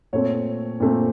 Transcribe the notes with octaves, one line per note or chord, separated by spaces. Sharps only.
A#2 A3 C4 C#5
A#2 A3 C4